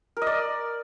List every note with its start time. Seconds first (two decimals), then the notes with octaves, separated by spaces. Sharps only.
0.17 A#4
0.22 D#5
0.27 D5